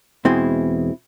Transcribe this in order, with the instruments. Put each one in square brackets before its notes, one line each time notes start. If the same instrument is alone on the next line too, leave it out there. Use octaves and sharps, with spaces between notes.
[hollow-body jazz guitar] E2 B2 G#3 C4 E4